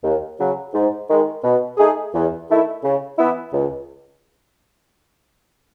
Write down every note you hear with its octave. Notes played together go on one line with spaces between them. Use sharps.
D#2
C#3 F#3
G#2
D#3 G#3
B2
A3 D#4 G#4
E2
D#3 A3 E4
C#3
E3 B3 E4
C#2